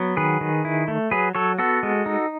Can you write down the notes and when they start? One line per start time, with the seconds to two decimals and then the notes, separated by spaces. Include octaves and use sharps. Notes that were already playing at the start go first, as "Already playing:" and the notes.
Already playing: F#3 B3
0.17 D#3 G#4 B4
0.41 D#3
0.65 E4
0.88 A3
1.11 F#3 G#4 B4
1.35 F#3 A4 C#5
1.59 B3 F#4 A4
1.83 G#3
2.06 D#4